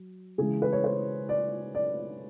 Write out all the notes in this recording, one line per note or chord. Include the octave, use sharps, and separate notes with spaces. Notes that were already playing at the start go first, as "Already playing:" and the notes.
Already playing: F#3
C#3 E3 G#3 G#4
B4
C#5
C5
D5
D5